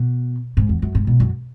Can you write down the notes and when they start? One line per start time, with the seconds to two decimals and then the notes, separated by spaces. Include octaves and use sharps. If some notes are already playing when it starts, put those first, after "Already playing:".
Already playing: B2
0.57 G#2
0.69 E2
0.82 F#2
0.95 G#2
1.07 B2
1.20 F#2